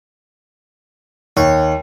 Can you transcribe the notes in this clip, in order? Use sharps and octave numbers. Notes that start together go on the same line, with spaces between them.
D#2 C#5